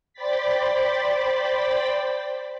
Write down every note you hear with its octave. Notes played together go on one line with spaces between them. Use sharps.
C5 D5 G5 B5 A6 B6